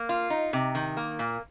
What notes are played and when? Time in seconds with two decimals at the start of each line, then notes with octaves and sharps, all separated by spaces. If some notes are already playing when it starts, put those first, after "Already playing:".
Already playing: A#3
0.09 F4
0.30 D#4
0.53 C3
0.75 D#3
0.97 A#3
1.19 A#2